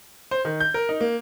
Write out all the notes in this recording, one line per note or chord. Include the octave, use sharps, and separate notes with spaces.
C5
D#3
G6
A#4
D#4
A#3